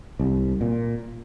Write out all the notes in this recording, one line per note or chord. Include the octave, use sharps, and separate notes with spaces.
C2
A#2